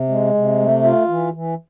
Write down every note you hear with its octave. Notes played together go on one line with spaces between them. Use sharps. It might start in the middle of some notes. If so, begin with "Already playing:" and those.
Already playing: C3
G#3
C3
A3
F4
E3
E3